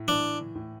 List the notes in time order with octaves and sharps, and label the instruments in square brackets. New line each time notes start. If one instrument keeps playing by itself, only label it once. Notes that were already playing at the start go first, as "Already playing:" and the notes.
Already playing: [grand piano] A2
[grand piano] E3 [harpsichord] D4
[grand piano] A2